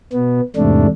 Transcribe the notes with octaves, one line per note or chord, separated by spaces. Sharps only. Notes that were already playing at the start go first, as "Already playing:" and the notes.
B2 B3
E2 G#2 C3 A3 D4